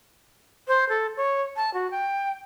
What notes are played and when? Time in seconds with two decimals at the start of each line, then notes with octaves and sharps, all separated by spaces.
0.68 C5
0.89 A4
1.17 C#5
1.56 A5
1.74 F#4
1.91 G5